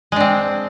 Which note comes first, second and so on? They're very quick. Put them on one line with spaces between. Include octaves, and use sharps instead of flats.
G#3 D4 C4